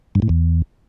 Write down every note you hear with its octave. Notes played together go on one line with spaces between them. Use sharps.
G2
A2
E2